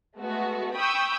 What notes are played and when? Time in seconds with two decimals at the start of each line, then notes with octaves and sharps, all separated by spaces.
0.17 G#3 A3 B3 F#4
0.76 G5 B5 C#6 D#6 E6 G6